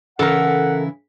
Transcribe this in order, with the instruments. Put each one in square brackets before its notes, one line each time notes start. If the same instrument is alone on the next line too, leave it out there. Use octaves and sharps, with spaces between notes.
[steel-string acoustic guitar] C#3 E3 E4 [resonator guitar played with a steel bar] A4 A#4 [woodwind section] F#5